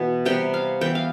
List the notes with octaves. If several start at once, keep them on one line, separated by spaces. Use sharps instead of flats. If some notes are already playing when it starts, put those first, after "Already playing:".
Already playing: B2 E3 B3
C3 G3 B3 G5
F5
E3 B3 G5
F5